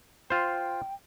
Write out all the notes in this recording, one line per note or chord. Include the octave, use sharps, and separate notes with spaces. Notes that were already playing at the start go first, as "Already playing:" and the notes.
F4 C5 G5